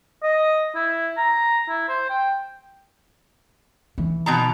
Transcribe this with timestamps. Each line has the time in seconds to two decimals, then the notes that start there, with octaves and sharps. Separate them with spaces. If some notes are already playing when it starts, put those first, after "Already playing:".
0.23 D#5
0.75 E4
1.17 A#5
1.69 E4
1.89 C5
2.10 G5
3.98 E3
4.26 B2 D#3 A#5